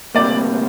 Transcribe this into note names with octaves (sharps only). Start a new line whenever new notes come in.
D2 C3 G3 A#3 D5